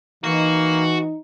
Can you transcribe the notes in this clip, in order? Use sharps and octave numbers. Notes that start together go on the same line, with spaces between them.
E3 A#3 D#4 F#4